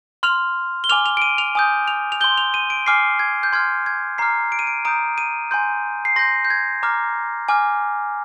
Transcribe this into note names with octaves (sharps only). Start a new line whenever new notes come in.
C6 F6 F7
G7
G#5 D6 F6 F7
F7
D7
D#7
F7
G#5 D#6 G6
F7
F7
C6 G6 G7
F7
D#7
D7
G#5 D6 F6 C7
G#6
G6
C6 F6 G#6
G#6
A#5 D6 F6 C7
D7
D#7
D7
A#5 D#6 G6 D7
D#7
G#5 C6 G6
C7
C6 G6 A#6
G6
G#6
A#5 D6 F6
G#5 D6 F6